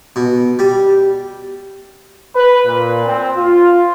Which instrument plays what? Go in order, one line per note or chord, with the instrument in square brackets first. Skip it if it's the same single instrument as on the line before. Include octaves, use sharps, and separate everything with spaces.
[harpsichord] B2
G3
[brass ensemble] B4
A#2
C4
F4